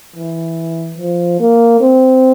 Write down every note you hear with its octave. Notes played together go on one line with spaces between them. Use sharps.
E3
F3
A#3
C4